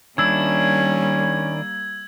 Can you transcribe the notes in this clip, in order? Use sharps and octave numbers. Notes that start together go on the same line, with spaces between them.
D#3 G3 A#3 C#4 D4 E4 E6 G#6